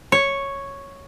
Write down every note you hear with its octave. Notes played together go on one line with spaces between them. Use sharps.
C#5